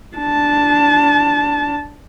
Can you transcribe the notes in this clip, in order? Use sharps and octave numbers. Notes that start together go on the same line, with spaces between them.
D4 A5